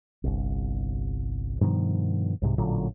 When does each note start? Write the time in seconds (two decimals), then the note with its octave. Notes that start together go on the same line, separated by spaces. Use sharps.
0.24 G1 C2
1.61 G2 B2 D#3 F3
2.42 C2 G#2 C3
2.58 A1 A#2 D3 F#3